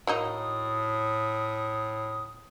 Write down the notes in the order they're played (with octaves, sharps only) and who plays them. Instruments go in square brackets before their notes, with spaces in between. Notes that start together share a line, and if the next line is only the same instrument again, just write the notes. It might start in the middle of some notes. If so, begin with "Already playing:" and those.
[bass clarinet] A2 [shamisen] F#3 A#3 D#4 [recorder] D#6